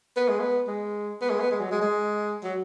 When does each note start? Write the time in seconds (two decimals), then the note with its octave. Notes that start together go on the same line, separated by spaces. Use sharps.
0.16 B3
0.28 G#3
0.40 B3
0.68 G#3
1.21 B3
1.30 G#3
1.40 B3
1.51 G#3
1.61 F#3
1.71 G#3
1.81 G#3
2.44 F#3